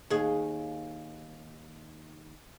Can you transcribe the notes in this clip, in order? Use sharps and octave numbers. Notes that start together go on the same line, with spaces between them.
D#2 G#4